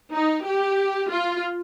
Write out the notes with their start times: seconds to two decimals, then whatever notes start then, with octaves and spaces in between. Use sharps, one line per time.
0.13 D#4
0.46 G4
1.10 F4